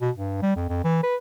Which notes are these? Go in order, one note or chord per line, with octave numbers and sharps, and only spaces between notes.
B2
G2
G3
F2
F2
E3
B4